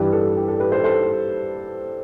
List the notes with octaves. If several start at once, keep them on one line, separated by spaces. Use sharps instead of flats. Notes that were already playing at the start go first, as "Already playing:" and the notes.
Already playing: G2 E3 G3 G4 B4
A4
G4
A4
G4 B4
A4 C5
A4 C5